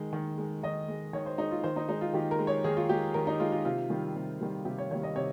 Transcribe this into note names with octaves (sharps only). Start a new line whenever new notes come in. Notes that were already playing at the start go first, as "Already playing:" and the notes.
Already playing: D#3 G#3
D#3
G#3
D#3 D#5
G#3
D#3 C#5
C5
G#3 D#4
F4
D#3 C5
D#4
G#3 D#4
F4
D#3 G4
A#4
G#3
C#5
D#3 G#4
F4
G#3 G4
D#3 A#4
D#4
G#3 F4
F4
C3 F4
D#3 G3
C3
D#3 G3
C3 G4
C#5
D#3 G3 C#5
D#5
C3 C#5